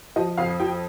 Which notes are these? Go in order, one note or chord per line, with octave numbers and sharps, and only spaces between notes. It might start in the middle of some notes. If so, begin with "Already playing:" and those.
F3 D#5
F2 F5
F3 G5